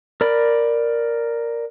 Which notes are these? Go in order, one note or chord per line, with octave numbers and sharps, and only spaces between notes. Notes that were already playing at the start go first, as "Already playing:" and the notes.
A#4 D5 B5